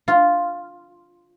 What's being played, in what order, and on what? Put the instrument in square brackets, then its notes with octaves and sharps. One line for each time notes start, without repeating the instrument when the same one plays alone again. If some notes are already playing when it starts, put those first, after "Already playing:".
[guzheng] F4